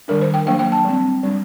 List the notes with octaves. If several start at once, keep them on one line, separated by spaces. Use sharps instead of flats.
D#3 G3 D4 A#4
C5
G5
F#3 A#3 D4 G5
G5
A5
G3 C4
G3 D4